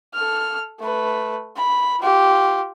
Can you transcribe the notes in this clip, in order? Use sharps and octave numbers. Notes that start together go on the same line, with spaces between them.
A4 F6
A3 B4
B5
F4 G4